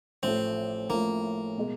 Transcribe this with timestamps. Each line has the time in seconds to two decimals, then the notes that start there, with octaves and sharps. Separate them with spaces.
0.23 A1 A2 F3 A3 C4
0.90 A1 A2 F3 A3 A#3
1.58 B2 G#3